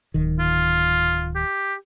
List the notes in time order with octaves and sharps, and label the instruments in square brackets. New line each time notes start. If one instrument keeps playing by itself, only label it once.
[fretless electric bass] D1 D#3
[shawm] F4
G4